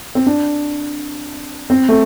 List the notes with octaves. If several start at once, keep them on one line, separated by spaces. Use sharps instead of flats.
C4
D4
C4
A3